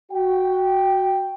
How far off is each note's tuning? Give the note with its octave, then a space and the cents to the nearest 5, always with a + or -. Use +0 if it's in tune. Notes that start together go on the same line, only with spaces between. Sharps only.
F#4 +0 G5 +0